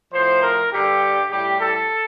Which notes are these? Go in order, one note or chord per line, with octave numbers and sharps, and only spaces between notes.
A2 F3 C5
A#4
G2 D3 G3 G4
A2 G3 G4
A4